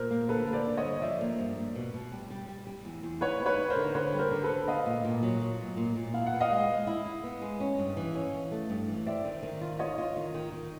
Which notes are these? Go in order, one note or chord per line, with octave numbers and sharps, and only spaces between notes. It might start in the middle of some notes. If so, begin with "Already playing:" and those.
Already playing: A#2 A#4 C5
A#3
D3 A4 B4
A#3
C5 D5
D3
C#5 D#5
G2
F3 D5 E5
A#3
G2
A#3
B2
B2
G3
G3
G3
G3
E2
E2
D#4 B4 C#5
C4
B4 C#5
D#4
A#4 C5
D3
D3 B4 C#5
G3
A#4 C5
D3
A4 B4
D3
B3 D#5 F5
A#2
A#2
F#3
F#3
A#2
A#2
A#2
E4 F5
F#5
B3
D#5 F5
G#3
G#3
E4
E4
B3
G#3
C#4
G2
E3
C#4
E3
A3
G2
E3
C4 D5 E5
D#3
D#3
F4
F4 C#5 D#5
F4
D#3
D#3
D#3